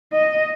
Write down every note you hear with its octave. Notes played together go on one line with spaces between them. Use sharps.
D#5